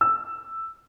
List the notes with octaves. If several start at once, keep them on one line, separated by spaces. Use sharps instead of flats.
E6